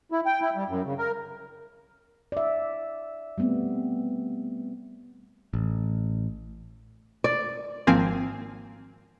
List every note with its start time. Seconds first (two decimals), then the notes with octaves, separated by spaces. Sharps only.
0.11 E4
0.26 G5
0.41 E4
0.56 G3
0.69 F#2
0.85 C#3
0.98 A#4
2.32 D5 E5
3.38 G3 A3 B3 C4
5.54 A1
7.24 D5
7.87 G#1 F3 A#3 C4 G#5